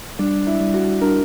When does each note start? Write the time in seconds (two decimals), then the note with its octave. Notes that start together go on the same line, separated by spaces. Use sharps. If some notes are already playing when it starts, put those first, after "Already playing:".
0.19 G3 D4
0.47 E4
0.60 G3
0.74 F#4
1.01 D4 A#4